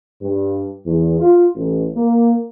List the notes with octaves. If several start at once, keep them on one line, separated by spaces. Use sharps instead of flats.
G2
E2
F4
A1
A#3